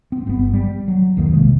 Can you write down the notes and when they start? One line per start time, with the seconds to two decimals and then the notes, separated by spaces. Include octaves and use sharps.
0.12 C4
0.27 G1 B3
0.53 G3
0.88 F#3
1.17 B1 F2 D#3 A#3
1.33 C3 D#3 G#3 A#3